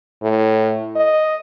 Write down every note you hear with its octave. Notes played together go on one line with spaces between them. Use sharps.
A2
D#5